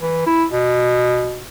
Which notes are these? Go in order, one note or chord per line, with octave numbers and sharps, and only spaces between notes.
E3
E4
B2